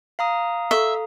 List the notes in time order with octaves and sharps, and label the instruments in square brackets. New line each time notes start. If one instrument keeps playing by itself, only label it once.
[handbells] F5 A#5 D#6
[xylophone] A4 C#6 G7 [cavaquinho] E5